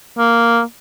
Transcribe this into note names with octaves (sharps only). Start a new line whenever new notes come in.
A#3